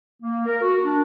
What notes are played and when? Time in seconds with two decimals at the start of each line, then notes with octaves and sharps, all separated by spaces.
0.22 A#3
0.46 A#4
0.61 F#4
0.84 D4